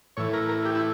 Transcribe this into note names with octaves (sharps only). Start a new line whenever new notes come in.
A2 E3 C#5
A#4
A#4
G4
E4